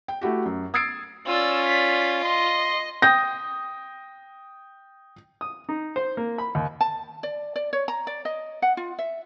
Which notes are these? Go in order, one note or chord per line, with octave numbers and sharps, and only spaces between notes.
G5
A3 E4 F#4 G4
F#2
D#6 E6 G#6 A6 C7 D7
C#4 F4 D5 E6
D5 B6
D#5 C6
G5 D#6 G6 A#6
D#6
D#4
C5
A#3
B5
D#2
A5
D5
D5
C#5
A#5
D5
D#5
F#5
F4
E5